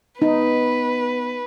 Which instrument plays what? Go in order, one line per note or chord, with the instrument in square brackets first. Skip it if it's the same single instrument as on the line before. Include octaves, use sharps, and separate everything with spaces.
[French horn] B3 [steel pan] D#4 [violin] B4